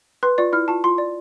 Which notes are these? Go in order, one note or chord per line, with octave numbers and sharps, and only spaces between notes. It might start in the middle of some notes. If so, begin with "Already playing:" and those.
B4 C6
F4 D5
E4 F6
F4 A5
F4 C6
D5